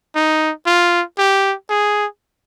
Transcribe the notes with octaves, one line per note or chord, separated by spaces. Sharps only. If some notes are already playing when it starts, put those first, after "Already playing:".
D#4
F4
G4
G#4